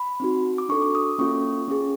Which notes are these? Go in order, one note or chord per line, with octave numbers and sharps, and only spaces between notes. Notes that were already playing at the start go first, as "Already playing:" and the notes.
Already playing: B5
C4 D#4 F#4
D6
D4 F#4 A4 C#6
D6
D#6
A#3 C#4 F4 A4 C#6
C#4 F4 G#4